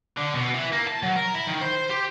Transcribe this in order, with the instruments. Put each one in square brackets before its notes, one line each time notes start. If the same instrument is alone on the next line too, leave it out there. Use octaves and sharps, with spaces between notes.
[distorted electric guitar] D3
B2
E3
A#3
A5
F#3
A#4
E4
D#3
C5
G4